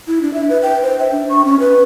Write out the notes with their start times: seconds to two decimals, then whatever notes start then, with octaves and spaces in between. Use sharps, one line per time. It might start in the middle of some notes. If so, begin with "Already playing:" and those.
0.08 E4
0.22 D4
0.34 E5
0.49 B4
0.63 G5
0.83 C5
1.00 E5
1.12 D4
1.30 C#6
1.45 C#4
1.60 B4